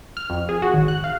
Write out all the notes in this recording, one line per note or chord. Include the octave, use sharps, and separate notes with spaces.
F6
F2
G#4
F#4
G#1
F#6
F5